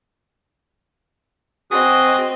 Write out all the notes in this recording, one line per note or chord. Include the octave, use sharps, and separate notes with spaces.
C4 F#4 G#4 D#5 D#6